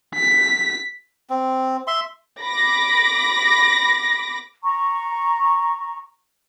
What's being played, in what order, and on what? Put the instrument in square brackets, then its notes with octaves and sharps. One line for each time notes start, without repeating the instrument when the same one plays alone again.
[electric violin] B6
[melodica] C4
E5 C6
[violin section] B5 D6 A#6
[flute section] A#5 C#6